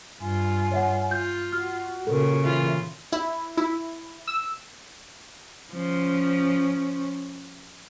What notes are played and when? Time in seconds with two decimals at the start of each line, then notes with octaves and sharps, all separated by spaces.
0.20 G2 F4 G#5
0.71 C#5 E5 F#5
1.11 F4 G6
1.52 F#4 F6
2.07 A#2 C#3 A4 A#4
2.44 E3 F4 E5
3.12 E4
3.57 E4
4.27 E6
5.73 F3 C#4